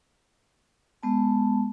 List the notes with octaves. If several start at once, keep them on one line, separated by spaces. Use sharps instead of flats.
G#3 B3 A5